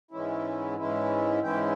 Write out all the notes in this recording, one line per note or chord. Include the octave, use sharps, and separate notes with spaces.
G#2 E3 G#3 C#4 E4
G#2 E3 G#3 C#4 E4
G#2 E3 G#3 C#4 E4 G5